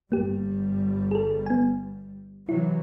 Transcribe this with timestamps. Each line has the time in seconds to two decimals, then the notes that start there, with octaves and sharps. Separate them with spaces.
0.12 G1 G3 A#3 G4
1.11 G#4 A4
1.46 B3 G#5
2.49 C3 E3 F#3 E4